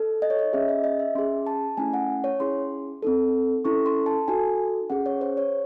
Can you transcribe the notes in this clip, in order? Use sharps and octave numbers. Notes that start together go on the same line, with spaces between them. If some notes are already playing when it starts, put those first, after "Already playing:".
Already playing: D#4 A4
D#5
C#5
D#5
C#4 G#4 E5
D#5
D#5
E5
C#4 G#4 C6
A5
A3 C#4 E4 G#5
F#5
C#5
C#4 E4 G#4 C6
C4 D#4 A4
C#4 E4 A4 C#6
C6
A5
D#4 F#4 A4 G#5
C#4 G#4 F#5
C#5
C5
C#5